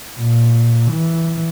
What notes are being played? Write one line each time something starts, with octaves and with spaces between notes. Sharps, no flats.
A#2
E3